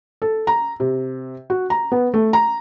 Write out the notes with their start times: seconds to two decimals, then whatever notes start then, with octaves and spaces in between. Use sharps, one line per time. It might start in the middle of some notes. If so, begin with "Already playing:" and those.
0.22 A4
0.47 A#5
0.80 C3
1.50 F#4
1.70 A#5
1.92 B3
2.14 A3
2.33 A#5